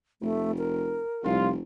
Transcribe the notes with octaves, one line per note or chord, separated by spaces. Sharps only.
F1 A3
A#4
F1 C2 F4